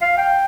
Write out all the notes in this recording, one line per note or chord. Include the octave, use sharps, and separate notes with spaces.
F5
G5